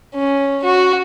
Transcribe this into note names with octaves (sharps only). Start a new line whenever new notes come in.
C#4
F#4